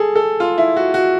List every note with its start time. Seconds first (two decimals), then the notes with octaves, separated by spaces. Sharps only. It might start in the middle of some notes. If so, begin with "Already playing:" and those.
Already playing: G#4 A4
0.16 A4
0.40 F4
0.58 E4
0.76 F#4
0.94 F#4